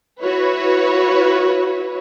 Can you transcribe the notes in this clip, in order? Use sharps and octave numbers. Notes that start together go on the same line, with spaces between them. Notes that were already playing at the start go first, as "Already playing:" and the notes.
E4 F#4 B4 C#5